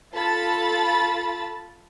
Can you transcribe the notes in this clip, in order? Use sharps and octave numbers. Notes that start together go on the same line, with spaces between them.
F4 A4 A5 B5 A6